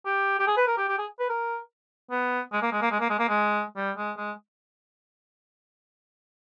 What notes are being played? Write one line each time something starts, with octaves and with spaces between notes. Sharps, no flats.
G4
G4
G#4
B4
A#4
G4
G4
G#4
B4
A#4
B3
G#3
A#3
G#3
A#3
G#3
A#3
G#3
A#3
G#3
G3
G#3
G#3